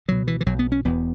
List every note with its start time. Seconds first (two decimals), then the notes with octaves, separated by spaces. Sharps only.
0.08 C#2 B2 F#3
0.27 E3
0.41 E3
0.46 B1 B2 F#3
0.59 B3
0.72 C#4
0.85 E1 E2 B2 B3